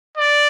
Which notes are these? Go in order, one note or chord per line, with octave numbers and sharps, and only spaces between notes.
D5